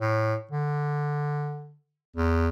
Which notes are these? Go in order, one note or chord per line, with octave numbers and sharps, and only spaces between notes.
A2
D3
E2